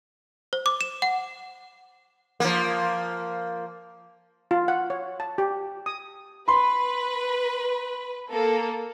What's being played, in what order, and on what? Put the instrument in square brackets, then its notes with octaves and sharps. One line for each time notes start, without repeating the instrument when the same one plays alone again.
[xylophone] C5
D6
E7
F#5
[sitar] F3 A#3
[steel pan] F4
F#5
C#5
A5
G4
D#6
[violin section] B4 [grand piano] B5 C6
[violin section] A#3 A4